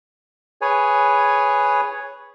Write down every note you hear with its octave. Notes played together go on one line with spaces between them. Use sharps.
G#4 B4 C#5 G#5